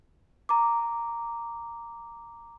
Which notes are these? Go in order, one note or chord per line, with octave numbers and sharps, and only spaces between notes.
A#5 D6